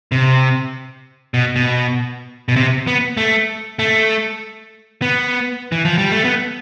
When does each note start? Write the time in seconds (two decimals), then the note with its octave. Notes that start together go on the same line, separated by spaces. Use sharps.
0.12 C3
1.34 B2
1.56 B2
2.48 B2
2.56 C3
2.87 B3
3.17 A3
3.79 A3
5.02 B3
5.72 E3
5.85 F3
5.98 G3
6.11 A3
6.25 B3